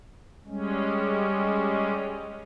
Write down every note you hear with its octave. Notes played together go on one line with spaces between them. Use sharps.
G3 G#3 C#4